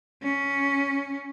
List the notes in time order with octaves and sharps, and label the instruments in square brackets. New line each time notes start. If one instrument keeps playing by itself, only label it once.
[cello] C#4